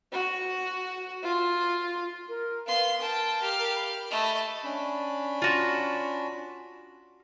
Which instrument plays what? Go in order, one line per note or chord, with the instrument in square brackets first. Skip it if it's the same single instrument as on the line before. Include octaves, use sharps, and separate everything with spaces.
[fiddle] F#4
F4
[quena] A#4
[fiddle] B3 C6 [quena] F5
[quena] A#4 [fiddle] G5 A5
[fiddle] G4 F5
[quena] B5
[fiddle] A3 D#5
[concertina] C#4 D4 B5
[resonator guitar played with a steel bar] F4 F#4